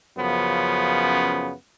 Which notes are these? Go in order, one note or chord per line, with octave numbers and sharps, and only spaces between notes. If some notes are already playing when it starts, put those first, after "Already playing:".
F#2 C#3 F3 B3